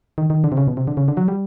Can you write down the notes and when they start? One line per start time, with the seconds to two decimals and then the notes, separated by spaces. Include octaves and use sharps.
0.18 D#3
0.30 D#3
0.44 D3
0.52 C3
0.57 C#3
0.67 B2
0.77 C3
0.88 D3
0.97 C#3
1.08 D3
1.17 F#3
1.28 G3